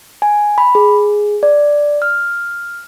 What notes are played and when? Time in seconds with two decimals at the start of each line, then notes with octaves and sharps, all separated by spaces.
0.22 G#5
0.58 B5
0.75 G#4
1.43 D5
2.02 F6